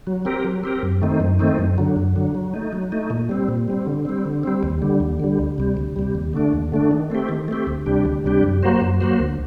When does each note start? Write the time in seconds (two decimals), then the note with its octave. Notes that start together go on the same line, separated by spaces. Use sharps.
0.07 F#3
0.25 C4 G4 A#4
0.44 F#3
0.64 C4 G4 A#4
0.83 F#2
1.01 D#3 A3 C4 D#4
1.20 F#2
1.39 D#3 A3 C4 D#4
1.59 F#2
1.78 D3 F#3
1.96 F#2
2.16 D3 F#3
2.35 F#3
2.54 A3 D#4
2.73 F#3
2.92 A3 D#4
3.10 A#2
3.29 G3 C4
3.48 A#2
3.68 G3 C4
3.87 D3
4.05 G3 C4
4.25 D3
4.43 G3 C4
4.63 D#2
4.82 D3 G3
5.00 D#2
5.20 D3 G3
5.39 D2
5.58 C3 G3
5.77 D2
5.96 C3 G3
6.15 D#2
6.33 D3 A3 D4
6.53 D#2
6.72 D3 A3 D4
6.91 D#3
7.10 A3 C4 G4
7.29 D#3
7.48 A3 C4 G4
7.67 D2
7.86 C3 G3 D4 G4
8.05 D2
8.24 C3 G3 D4 G4
8.43 F#2
8.63 F#3 A#3 F#4 C5
8.81 F#2
9.01 F#3 A#3 F#4 C5
9.20 D2